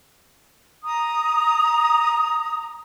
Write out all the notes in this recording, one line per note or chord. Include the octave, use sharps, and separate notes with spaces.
A#5 D#6